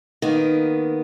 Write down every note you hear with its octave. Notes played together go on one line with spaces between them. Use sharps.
D#3 A#3 B3